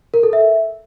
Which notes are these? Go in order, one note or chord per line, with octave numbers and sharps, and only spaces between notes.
A#4
A4
E5